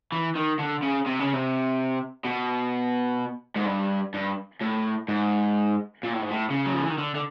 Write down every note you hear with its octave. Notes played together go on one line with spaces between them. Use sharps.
E3
D#3
D3
C#3
C3
C#3
C3
B2
G#2
G2
G2
A2
G#2
A#2
A2
G#2
A2
C#3
F#3
F3
E3
D#3
D3
D3